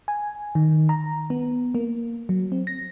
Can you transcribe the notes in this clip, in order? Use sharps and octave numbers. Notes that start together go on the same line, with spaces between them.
G#5
D#3
A#5
B3
A#3
F#3
C4
A#6